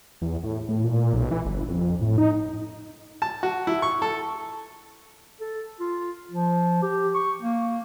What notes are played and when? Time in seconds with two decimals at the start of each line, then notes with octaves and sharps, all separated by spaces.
0.22 E2
0.44 A2
0.69 A2
0.84 A#2
1.13 B1
1.31 E3
1.46 G1
1.68 F2
2.01 A2
2.18 D#4
3.22 A5
3.43 F#4
3.67 E4
3.82 C#6
4.02 A4
5.41 A4
5.80 F4
6.31 F3
6.82 G4
7.14 C#6
7.42 A#3